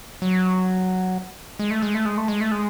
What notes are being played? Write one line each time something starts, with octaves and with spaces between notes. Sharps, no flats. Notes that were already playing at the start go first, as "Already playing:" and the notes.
F#3
G#3
A3
G#3
A3
G#3
A3
G#3
A3
G#3